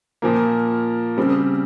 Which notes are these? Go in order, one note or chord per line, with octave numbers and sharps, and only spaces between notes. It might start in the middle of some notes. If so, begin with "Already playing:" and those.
A#2 F3 A#3
C#3 G3 C4